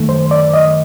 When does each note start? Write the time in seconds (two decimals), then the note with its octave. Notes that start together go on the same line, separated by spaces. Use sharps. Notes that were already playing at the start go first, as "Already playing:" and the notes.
Already playing: F#2 D#3 A3
0.09 C5
0.31 D5
0.54 D#5